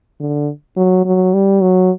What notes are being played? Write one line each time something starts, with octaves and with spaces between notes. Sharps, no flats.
D3
F#3
F#3
G3
F#3